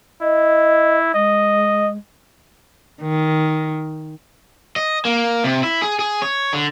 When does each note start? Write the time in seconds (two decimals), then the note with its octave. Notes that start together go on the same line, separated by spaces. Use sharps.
0.21 E4 D#5
1.14 G#3 D#5
3.02 D#3
4.76 D#5
5.05 A#3
5.44 C3
5.63 E4
5.82 G#4
5.99 G#4
6.22 C#5
6.53 D3